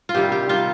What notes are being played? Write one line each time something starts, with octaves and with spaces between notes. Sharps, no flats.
F4
C3 D#3 G3 G4
G4
C3 D#3 G3 F4